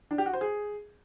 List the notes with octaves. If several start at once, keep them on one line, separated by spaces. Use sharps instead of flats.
D4
G4
F#4
C5
G#4